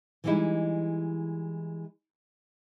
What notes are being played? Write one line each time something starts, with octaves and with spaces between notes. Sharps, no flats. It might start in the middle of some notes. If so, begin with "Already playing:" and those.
E3 G3 G#3 D#4 E4